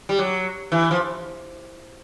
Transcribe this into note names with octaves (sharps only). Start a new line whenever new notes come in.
G3
F#3
E3
F3